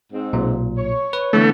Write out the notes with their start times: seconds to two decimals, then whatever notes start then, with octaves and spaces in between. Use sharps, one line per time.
0.12 G#2 C4
0.33 B1 A#2
0.78 C#5
1.13 B4
1.33 D3 E3 A3 B3